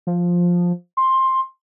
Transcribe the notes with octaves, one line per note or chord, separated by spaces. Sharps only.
F3
C6